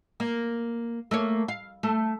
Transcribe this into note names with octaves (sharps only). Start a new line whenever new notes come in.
A#3
A3 A#3 C#5
F5
A3